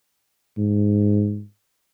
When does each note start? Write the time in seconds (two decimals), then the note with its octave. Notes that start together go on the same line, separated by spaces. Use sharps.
0.58 G#2